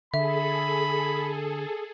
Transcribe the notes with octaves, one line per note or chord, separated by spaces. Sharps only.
D3 G#4 A4 E5 B5